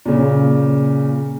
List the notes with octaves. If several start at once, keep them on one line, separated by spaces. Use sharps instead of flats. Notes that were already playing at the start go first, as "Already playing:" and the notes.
A#2 C#3